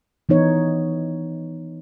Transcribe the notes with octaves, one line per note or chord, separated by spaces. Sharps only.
E3 B3 D#4 C#5